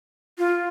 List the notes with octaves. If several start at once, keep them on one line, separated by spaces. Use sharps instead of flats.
F4